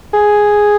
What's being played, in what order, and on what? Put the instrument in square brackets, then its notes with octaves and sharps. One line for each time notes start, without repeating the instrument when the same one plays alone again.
[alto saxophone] G#4